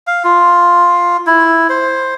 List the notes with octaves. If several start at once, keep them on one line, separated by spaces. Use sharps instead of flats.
F5
F4
E4
C5